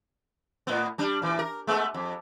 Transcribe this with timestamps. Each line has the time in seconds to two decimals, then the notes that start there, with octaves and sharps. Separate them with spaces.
0.67 A2 B3
0.98 G3 D4
1.22 A#2 E3
1.39 A#4
1.67 G#3 A3 B3
1.94 F2